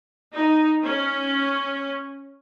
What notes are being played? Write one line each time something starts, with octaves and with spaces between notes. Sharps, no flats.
D#4
C#4